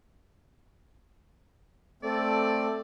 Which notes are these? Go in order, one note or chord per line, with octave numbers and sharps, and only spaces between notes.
A3 C4 A4 D5